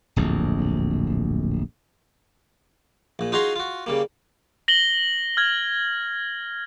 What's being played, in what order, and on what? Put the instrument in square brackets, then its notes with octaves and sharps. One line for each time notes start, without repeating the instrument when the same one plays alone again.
[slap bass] D1 A#1 F2
[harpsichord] A#1 A#2
D#4 F4 F#4 G#4 A#5 C6
F4 F#4
C#3 G3 A#3
[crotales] A#6 F#7 G7
F6 G#6